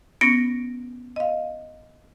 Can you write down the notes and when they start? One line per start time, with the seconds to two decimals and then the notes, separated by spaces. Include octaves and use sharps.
0.21 B3 C#4 A#6 C#7 D7
1.16 D#5 F5